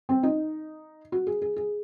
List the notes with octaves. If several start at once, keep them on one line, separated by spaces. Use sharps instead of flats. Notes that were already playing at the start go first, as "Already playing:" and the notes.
C4
D#4
F#4
G#4
G#4
G#4